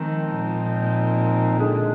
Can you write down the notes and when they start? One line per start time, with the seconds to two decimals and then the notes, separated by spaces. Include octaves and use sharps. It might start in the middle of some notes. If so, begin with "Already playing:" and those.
Already playing: D#3 F3 G#3 C4 D#4
0.33 A#2
1.57 D3 G#3 D4 G#4